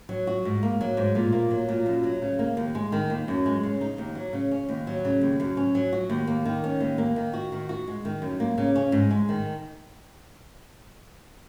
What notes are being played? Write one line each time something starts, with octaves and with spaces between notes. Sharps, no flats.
F#3
F#4
G#2
A#3
F#3
G#2
A#2
A#3
F#3
A#2
F#2
F#3
C#3
A#3
D#2
G#3
D#3
D#2
F#2
G#3
C#3
D#4
D#2
F#3
C#3
C#4
D#2
F#3
C#3
D#2
F#2
C#4
F#3
F#4
D#2
A#3
D#3
C#4
D#2
A#3
D#3
F#4
D#3
F#4
G#3
D#3
F#2
A#3
C#3
C#4
G#2
G#3
D#3